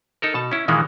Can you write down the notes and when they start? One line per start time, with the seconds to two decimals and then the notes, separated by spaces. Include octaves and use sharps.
0.22 D#4 A4 A#4
0.34 B2 A5
0.51 C#4 E4
0.68 A#2 D#3 E3 G#3 A#3 B3